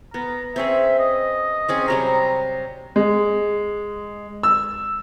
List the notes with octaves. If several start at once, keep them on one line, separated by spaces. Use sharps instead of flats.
B3 A#5
C4 C#4 G#4 E5
D#5
C4 C#4 G#4
C3 F#3 G3 A#5
G#3
E6